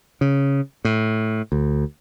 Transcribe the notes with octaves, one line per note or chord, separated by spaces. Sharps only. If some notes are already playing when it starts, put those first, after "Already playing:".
C#3
A2
D2